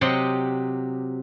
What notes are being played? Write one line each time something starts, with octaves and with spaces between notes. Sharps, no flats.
C3 F#3 G4 D#5 F#5 C6